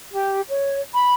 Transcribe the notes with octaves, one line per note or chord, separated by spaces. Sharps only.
G4
C#5
B5